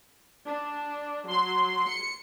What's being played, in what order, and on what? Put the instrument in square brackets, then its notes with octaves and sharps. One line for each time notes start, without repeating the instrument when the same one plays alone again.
[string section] D4
[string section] F#3 [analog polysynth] C6
[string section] C#7